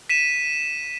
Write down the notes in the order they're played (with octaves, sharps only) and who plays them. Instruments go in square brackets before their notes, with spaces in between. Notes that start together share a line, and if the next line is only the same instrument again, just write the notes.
[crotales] B6 D#7 E7